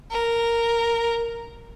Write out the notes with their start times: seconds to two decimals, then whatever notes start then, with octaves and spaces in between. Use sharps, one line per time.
0.11 A#4